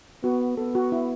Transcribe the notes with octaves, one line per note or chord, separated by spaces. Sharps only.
B3 F#4
B3 A4
F#4
E4